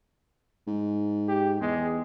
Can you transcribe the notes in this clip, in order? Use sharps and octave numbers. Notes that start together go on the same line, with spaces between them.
G#2
G4
E2 G#3